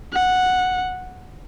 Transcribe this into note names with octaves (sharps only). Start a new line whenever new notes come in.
F#5